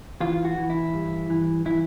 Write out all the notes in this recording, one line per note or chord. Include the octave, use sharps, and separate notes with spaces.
E3 F4
F#4
E3
E4
G2
E3
E3 E4